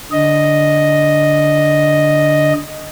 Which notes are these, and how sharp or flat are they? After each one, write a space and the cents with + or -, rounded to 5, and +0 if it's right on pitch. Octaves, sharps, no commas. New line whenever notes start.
D3 -5 D#5 +0